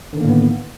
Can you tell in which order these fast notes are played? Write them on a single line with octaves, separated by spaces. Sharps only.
D3 D#3 A#3 A2 B3